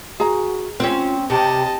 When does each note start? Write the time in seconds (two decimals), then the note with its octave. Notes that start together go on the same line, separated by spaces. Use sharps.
0.20 F#4 G#4 A#5
0.80 C4 C#4 F4
1.30 C3 G4 D#5 A5